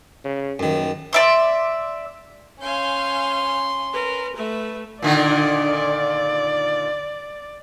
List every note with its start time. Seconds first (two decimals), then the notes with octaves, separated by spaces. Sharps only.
0.24 C#3
0.59 D#1 F#2 D#3
1.13 D5 E5 C6
2.60 C#4 F5 G#5 C6 G6
3.92 A#4 B4
4.35 A3 B4 E5
5.02 A#2 D3 D#3 D5